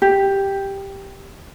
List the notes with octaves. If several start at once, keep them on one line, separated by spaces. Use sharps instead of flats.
G4